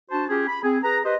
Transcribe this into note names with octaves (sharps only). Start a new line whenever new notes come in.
D4 F#4 C5 A5
C#4 F4 G4 G#4
B5
C4 G#4
G#4 B4 A#5
G4 B4 C5 D#5